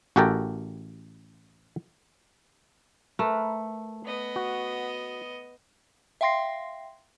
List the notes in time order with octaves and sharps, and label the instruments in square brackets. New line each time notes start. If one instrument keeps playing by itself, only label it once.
[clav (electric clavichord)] A1 F#4 G4 A4 A#4 G5
[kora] A3 [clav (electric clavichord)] A#4 B4
[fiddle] B3 D#5
[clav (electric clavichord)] F#4
[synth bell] E5 F5 G5 C6 A#6 C7